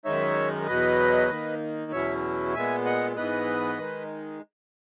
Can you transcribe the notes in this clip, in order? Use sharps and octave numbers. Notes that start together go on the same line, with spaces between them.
F#2 D#3 G#3 D#4 C#5 E5
E2 B2 F#3 B4 D#5
D#3 A#3 D#4
E2 B2 F#3 C#4 E4 C#5 E5
A#2 G#3 B3 E5 G#5
D#5 F#5
G#2 E3 B3 B4 D#5
D#3 G#3 D#4